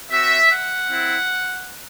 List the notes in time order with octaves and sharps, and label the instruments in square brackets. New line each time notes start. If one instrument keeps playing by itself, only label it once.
[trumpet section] C4 F#4 E5
F#5
C4 E4